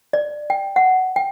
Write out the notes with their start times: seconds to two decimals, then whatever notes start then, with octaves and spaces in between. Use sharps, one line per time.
0.13 D5
0.50 G5
0.76 F#5
1.16 G5